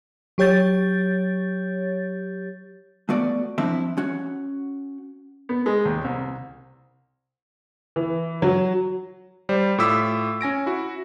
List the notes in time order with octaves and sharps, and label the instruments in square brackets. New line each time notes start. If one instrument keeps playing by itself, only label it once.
[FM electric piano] F#3 G4 C#5 G6 A6
[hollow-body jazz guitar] A3 B3 F#4 D5
F3 C4 D4 E4 E5
C#4 F#4
[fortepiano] B3
G#3
D#2
C2
[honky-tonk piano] E3
F#3
[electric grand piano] G3 C5 D5
A2 F4 D6 E6 B6
C#4 G#5 A#6 D7
E4 F#4